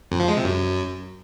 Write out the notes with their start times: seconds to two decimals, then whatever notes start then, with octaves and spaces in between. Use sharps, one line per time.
0.11 F2
0.20 F3
0.28 G#3
0.36 C3
0.45 F#2